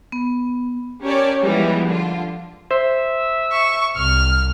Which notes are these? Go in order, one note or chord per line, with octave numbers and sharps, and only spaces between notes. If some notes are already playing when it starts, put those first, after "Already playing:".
B3
C#4 G4 A#4 C#5 D5 A5
E3 F3 G3 G#3 B3
D3 F4
C5 E5
C#6
C2 F6